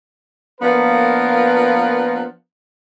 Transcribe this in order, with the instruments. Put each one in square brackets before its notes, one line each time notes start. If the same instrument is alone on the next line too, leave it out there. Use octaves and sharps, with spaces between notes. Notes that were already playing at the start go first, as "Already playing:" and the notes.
[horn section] F3 A#3 B3 D4 A#4 B4